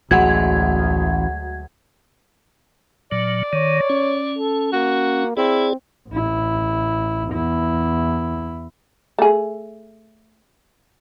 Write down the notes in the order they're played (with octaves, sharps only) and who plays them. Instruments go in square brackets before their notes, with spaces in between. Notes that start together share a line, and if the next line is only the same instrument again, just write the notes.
[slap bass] A1 [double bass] D2 [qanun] F#3 G#3 [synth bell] F#5 G#6
[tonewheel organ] A#2 F#3 [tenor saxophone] D5
[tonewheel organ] D#3 [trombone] C#5
[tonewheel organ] C#4
[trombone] A4
[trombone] A#3 [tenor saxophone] F#4
[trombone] C4 [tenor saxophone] E4 [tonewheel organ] G#4 D5
[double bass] A1 E4
E2 E4
[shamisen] A3 G#4